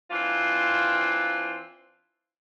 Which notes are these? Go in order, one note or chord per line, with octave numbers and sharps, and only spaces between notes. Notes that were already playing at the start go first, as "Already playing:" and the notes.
E3 C4 D4 F4